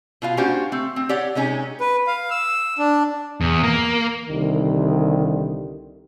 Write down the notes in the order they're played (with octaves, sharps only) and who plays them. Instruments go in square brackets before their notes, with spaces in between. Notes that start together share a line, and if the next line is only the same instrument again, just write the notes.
[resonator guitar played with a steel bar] B2 F4 F5
A#3 C#4 D4 F#4 G4 C5
A3 C4
C4
G4 C#5 D5 F#5
C3 G#3 C#4 D#4
[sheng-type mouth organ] B4
F5
E6
D4
[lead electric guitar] E2
A#3
[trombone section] C2 D3 D#3